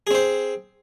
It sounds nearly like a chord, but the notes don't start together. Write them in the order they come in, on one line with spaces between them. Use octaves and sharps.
G#4 C4 C5